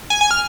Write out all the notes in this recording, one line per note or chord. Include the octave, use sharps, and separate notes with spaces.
G#5
G#5
F6